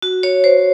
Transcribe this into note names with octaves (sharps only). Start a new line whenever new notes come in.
F#4
C#5
C5